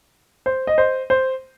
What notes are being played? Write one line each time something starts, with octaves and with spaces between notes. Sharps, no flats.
C5
D#5
C5
C5